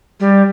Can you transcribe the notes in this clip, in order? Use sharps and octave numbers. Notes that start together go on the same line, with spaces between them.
G3